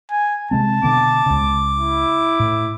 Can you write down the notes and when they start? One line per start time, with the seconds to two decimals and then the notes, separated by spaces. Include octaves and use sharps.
0.11 G#5
0.51 C3 G#3 C4 A5
0.83 B2 D3 B3 D6
1.26 C#2 C#3
1.77 E4
2.40 A2